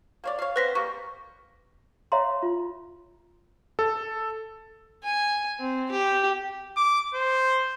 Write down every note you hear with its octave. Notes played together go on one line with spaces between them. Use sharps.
A#3 C#5 D5
C#5 F5
B3 C4 B4 C5 A#6 B6
G3 A#3 C#6
C#5 E5 F5 A#5 C6
F4
A4
G#5
C4
G4
D6
C5